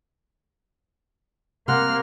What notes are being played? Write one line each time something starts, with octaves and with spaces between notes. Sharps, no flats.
C3 A#3 A#4 F#5 C6 F6